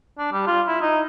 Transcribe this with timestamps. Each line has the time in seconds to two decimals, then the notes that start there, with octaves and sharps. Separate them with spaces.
0.18 D4
0.32 G3
0.47 F4
0.68 E4
0.82 D#4